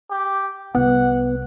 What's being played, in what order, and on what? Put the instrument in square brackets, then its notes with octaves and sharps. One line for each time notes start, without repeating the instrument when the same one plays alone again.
[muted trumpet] G4
[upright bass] C2 [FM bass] B3 [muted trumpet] F#5